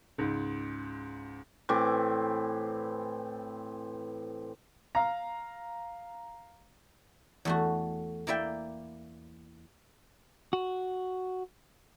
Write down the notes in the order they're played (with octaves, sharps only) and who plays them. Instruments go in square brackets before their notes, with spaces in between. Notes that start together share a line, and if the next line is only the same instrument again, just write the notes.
[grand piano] C#2 G#2
[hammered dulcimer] A2 E3 C4 D6
[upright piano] F5 A#5
[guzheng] E2 A3 F#4
A#3 E4 D5 E5 G5
[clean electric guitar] F#4